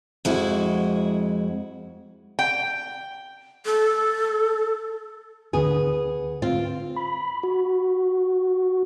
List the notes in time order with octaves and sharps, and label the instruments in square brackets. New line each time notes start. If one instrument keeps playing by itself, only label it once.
[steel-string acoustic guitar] F2 G#3 E4 F#4
[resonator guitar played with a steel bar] G5
[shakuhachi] A4
[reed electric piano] D2 D3 [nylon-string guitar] B3 G#4
[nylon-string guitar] C4 F4
[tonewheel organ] B5
F#4